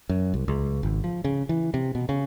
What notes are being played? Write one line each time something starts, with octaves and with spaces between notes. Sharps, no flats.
F#2
C2
C#2
G#1
F3
C#3
E3
C3
B2
C#3